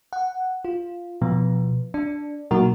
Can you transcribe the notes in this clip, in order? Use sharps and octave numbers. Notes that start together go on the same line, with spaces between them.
F#5
F4
B2 F3 B3
D4
B2 F#3 A#3 D#4 F#4 A#4